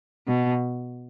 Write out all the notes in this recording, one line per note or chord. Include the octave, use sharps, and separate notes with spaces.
B2